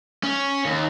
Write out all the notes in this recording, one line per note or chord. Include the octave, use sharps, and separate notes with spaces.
C#4
D#2